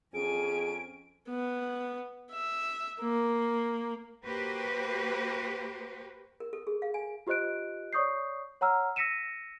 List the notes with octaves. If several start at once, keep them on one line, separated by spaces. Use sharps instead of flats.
F2 C#4 G#4 G#5 D7
B3
E5
A#3
A#3 F#4 G4 B4 C5
A#4
A4
G#4
F5
G#5
F4 G4 C5 D#5 F#6 D7
C#5 D5 C#6 D#6 G6 C7
C#5 F#5 A#5 E6 F6
E6 A#6 B6 C#7 D#7 E7